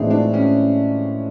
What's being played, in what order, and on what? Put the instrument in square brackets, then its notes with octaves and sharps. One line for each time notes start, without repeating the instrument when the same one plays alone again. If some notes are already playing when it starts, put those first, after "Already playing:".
Already playing: [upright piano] A2 E3 G#3 C4 [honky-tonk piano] D4 D#4
[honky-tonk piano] D4
C#4